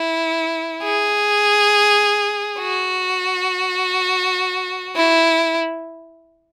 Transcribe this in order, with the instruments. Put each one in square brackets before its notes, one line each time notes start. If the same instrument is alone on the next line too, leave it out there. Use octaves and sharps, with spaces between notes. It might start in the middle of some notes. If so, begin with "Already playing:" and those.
Already playing: [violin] E4
G#4
F#4
E4